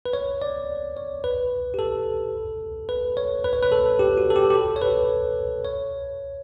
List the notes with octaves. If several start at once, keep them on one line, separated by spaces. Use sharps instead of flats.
B4
C#5
D5
C#5
B4
G4
A4
B4
C#5
B4
C#5
B4
A4
G4
F#4
A4
G4
G4
A4
C#5
B4
C#5